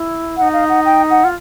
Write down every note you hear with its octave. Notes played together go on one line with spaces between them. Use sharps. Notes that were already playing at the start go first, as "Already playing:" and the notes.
Already playing: E4
D#4 E4 F#5
F5
F#5
G5
F#5
F4